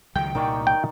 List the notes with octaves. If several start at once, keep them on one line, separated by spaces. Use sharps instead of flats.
C#2 D#3 F#3 G5
C2 A#2 D#3 D5 C#6
G5